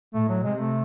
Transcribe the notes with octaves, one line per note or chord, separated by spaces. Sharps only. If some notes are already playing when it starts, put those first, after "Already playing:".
A2 A3
F#3
C3 G#3
A3